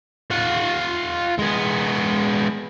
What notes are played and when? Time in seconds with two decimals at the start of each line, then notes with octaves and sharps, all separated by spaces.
0.31 F4 F#5
1.39 G#3 B3